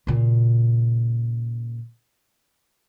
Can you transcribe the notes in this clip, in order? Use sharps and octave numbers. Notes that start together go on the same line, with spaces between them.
A#2 C#3